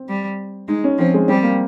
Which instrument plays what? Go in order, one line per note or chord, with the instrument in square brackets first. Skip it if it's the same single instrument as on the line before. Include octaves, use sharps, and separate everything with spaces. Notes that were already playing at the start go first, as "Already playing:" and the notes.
Already playing: [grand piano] C4
[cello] G3
[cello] G#3 [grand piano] D#4
[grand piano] C#4
[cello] F3 [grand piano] C4
[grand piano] G#3
[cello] G3 [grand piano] C4
[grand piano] A#3